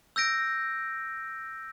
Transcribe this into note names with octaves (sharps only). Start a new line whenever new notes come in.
E6 G6 A#6 D7